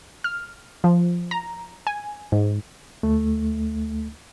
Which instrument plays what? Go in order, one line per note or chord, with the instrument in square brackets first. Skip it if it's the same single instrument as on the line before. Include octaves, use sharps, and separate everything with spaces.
[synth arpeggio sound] F6
F3
A#5
G#5
G#2
[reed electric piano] D2 A3